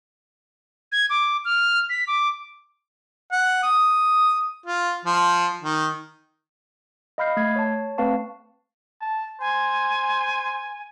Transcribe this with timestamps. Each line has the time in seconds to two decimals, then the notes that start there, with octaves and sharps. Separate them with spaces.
0.92 G#6
1.10 D6
1.45 F6
1.90 B6
2.07 D6
3.32 F#5
3.63 D#6
4.66 F4
5.05 F3
5.63 D#3
7.18 D#5 F5 B5 F6 G6 C7
7.37 A3 G#6 C7
7.56 C#5 A5
7.98 A3 C4 B4 F5 A5 C#6
9.01 A5
9.40 C5 G#5